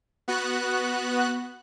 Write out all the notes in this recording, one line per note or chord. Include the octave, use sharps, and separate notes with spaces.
B3 F#4 F#6